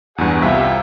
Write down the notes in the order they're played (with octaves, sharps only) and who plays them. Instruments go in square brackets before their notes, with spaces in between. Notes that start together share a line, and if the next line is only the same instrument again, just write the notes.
[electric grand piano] E2 G2 [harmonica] G#4 F#5
[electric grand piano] C2 C3 E5 [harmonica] E4 F4 G4